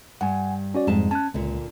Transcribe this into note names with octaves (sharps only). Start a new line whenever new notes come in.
G2 F#5 G#5
C#4 F#4 D5
F2 G#2 G3 A5
C#4 A5 F#6
C#2 A#2 D3